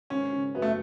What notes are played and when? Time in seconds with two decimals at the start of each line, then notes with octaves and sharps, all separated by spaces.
0.10 G#1 C#4
0.33 C#3
0.55 F#2 B3
0.62 A3